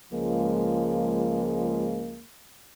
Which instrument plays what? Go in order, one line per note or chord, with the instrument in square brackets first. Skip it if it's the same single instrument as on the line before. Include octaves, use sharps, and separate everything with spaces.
[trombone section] C#2 F3 G#3 A#3